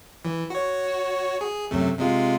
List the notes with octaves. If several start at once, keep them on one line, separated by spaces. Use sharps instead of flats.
E3
F#4 C#5
G#4
F#2 C3 A3
C3 G#3 F4